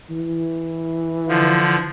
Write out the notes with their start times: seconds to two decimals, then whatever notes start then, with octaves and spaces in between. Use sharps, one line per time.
0.10 E3
1.28 D3 F3